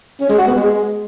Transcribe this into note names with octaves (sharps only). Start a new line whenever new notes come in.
C#4
G#3
F#4
B3
G#3